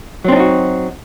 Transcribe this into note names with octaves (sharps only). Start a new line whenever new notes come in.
F#3 C4 D4 D#4 F#4